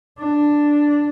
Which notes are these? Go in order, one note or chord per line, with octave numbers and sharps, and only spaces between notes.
D4